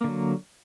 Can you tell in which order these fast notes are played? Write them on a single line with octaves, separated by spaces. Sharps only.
A#3 D3 F#3